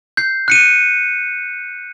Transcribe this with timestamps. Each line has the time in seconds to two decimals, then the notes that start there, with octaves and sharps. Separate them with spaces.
0.17 G6 C7
0.48 F#6 C#7 D#7